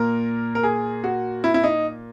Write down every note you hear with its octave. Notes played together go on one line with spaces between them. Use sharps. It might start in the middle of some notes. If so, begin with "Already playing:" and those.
Already playing: A#2 A#3 A#4
A#4
G#4
F#4
E4
E4
D#4